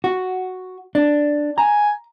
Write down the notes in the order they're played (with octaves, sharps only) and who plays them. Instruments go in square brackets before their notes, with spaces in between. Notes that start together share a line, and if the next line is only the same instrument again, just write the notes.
[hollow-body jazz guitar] F#4
D4
[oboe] G#5 [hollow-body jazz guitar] A#5